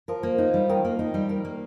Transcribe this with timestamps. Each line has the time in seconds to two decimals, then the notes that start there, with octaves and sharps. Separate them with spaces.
0.08 F3 A#4
0.23 A#3
0.38 D#4
0.54 G3
0.69 D#3 A#4
0.85 A#3
0.99 D#4
1.14 G3
1.29 A#4
1.45 A#3